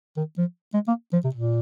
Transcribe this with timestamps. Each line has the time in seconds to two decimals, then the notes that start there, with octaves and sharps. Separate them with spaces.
0.17 D#3
0.38 F3
0.74 G#3
0.88 A#3
1.13 F3
1.24 C3
1.34 A#2